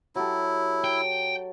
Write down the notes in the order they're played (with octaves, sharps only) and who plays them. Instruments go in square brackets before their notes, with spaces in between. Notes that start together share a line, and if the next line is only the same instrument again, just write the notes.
[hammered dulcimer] F#3 G4 A4 [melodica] E4
[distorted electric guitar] G5